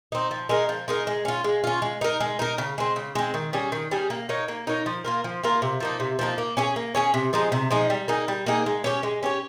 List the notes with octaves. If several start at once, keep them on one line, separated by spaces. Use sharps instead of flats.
C4 D#4
F3
G#3 D#4 A#4
F3
G#3 D#4 A#4
G#3
C#4 F4
G#3
C#4 F4
G#3
D#4 A#4
G#3
D#4 A#4
C#3
G#3 C4
C#3
G#3 C4
D#3
G3 C#4 G#4
D#3
G3 C#4 G#4
A#3
D#4 A#4 C#5
A#3
D#4 A#4 C#5
F3
A#3 F4 A#4
F3
A#3 F4 A#4
C3
F3 A#3 D#4
C3
F3 A#3 D#4
A#3
C#4 G#4 C#5
A#3
C#4 G#4 C#5
C3
F3 G#3 D#4
C3
F3 G#3 D#4
G3
A#3 D#4 G#4
G3
A#3 D#4 G#4
G#3
C#4 G4 C#5
G#3
C#4 G4 C#5